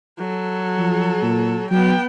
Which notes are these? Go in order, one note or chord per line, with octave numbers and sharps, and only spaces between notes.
F#3 A4
F3
A#2
F#3 B3 G5